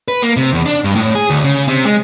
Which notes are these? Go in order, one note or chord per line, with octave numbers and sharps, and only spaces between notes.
B4
A#3
C3
E2
D4
G2
A2
G#4
D2
C#3
C3
G#3